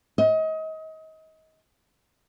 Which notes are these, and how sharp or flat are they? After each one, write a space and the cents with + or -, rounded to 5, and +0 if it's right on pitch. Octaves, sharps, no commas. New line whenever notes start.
D#5 +30